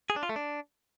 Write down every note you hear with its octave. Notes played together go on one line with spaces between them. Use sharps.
G#4
D4
F4
A3
D4